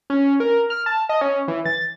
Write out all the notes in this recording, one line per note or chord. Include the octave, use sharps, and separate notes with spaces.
C#4
A#4
F6
A5
D#5
C#4
E3
A6